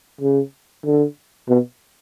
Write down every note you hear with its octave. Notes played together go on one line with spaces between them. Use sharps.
C#3
D3
B2